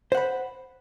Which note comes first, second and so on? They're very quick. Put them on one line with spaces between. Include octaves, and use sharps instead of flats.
C5 F#5 B5